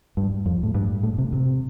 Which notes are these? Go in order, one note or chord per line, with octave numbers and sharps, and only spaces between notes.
G2
F2
A2
G2
A2
C3
C3